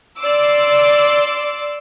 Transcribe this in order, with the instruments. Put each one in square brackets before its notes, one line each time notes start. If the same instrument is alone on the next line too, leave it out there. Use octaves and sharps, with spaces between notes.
[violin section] D5 C6 D6 E6